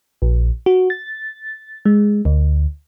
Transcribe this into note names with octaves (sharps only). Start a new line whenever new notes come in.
A#1
F#4
A6
G#3
D2